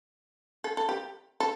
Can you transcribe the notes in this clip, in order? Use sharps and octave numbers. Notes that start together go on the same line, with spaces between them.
A4
A4
G4
A4